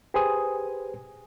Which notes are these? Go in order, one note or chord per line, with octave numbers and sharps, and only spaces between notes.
G4 G#4 B4 C5 G#5 D#6